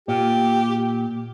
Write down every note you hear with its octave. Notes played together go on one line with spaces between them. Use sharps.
A#2 G4